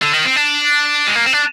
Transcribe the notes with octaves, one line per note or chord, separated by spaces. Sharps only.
D3
D#3
C4
D4
G#3
A#3
C4
D4